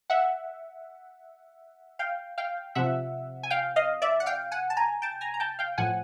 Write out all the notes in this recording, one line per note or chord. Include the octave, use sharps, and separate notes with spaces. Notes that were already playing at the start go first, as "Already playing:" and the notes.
E5 F#5
F5 G5
F5 G5
C3 F3 E5 F#5
G#5
F5 G5
D#5 F5
D5 E5
F#5
F5 G5
F#5 G#5
A5
G#5 A#5
G5 A5
G#5 A#5
A#5
G5 A5
F5 G5
A2 F3 F#5 G#5